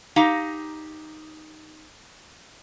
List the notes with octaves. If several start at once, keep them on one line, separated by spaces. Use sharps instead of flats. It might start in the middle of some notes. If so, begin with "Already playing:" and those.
D#4 G4 F5 A#5